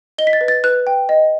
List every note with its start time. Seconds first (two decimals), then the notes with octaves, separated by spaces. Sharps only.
0.18 D#5 G7
0.27 B6
0.33 A6
0.41 B4
0.48 A6
0.64 B4 F#6
0.87 G5
1.09 D#5